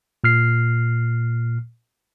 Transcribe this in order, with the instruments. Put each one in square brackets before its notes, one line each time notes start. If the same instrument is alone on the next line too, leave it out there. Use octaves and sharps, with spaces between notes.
[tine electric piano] A#2 F6 C7